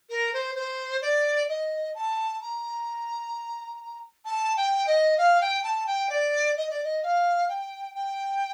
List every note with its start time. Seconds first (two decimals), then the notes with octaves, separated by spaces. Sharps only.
0.10 A#4
0.33 C5
0.55 C5
1.01 D5
1.49 D#5
1.95 A5
2.41 A#5
4.25 A5
4.57 G5
4.87 D#5
5.17 F5
5.41 G5
5.63 A5
5.86 G5
6.09 D5
6.57 D#5
6.70 D5
6.83 D#5
7.03 F5
7.49 G5
7.94 G5